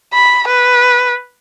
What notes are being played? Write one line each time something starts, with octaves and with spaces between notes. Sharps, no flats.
B5
B4